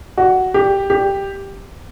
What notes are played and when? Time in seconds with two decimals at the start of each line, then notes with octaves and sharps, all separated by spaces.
0.17 F#4
0.54 G4
0.90 G4